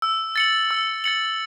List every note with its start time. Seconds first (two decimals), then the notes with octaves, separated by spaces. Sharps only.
0.02 E6
0.36 A6 C#7 F#7
0.71 E6
1.04 A6 C#7 F#7